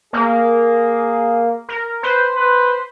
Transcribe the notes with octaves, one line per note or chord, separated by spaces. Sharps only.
A#3 G#4
A#4
B4 C5
B4